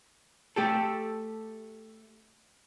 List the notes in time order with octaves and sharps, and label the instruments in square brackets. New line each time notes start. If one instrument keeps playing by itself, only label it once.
[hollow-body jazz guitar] A3 G4 A4